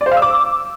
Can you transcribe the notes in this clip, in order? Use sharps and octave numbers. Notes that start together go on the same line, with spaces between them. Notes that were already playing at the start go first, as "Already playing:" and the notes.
D5
C5
F5
E6
D6